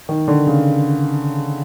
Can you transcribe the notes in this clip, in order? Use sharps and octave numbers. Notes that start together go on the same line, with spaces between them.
D#3
D3
C#3